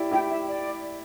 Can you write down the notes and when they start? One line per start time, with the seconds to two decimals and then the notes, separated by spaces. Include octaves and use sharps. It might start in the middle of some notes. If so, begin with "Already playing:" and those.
Already playing: E4 G4 D5
0.11 E4 G4 G5
0.30 E5
0.48 D5